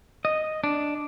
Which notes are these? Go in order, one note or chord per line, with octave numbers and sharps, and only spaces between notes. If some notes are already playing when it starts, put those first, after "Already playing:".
D#5
D4